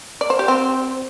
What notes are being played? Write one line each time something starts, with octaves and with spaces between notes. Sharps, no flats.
D5
C5
G4
C4